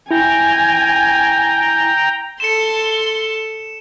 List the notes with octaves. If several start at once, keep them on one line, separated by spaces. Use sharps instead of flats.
E4 G5 G#5 A#5
A4 C6 C#7 E7